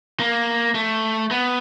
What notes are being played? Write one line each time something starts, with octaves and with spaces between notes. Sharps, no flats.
A#3
A3
B3